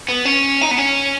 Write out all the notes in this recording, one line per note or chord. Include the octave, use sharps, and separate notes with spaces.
B3
C#4
D#4
B3
C#4